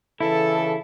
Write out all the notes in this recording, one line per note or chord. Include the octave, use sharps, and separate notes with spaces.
C#3 E3 E4 A4